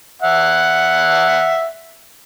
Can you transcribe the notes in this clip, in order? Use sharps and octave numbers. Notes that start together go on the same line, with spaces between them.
E5 F#5